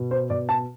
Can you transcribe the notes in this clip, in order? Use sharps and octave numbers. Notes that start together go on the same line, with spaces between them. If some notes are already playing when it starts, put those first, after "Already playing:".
Already playing: B2
C5
B2 D5
A5